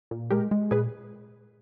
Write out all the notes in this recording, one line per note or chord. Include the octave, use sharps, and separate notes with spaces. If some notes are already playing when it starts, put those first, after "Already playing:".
A#2
G#3 G4 A#4
G#3
A#2 G#4 B4